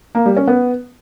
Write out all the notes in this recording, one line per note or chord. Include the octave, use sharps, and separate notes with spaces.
A#3
G3
C#4
B3